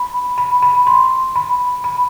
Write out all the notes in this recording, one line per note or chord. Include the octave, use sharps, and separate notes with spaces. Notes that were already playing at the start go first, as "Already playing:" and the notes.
Already playing: B5
B5
B5
C6
B5
B5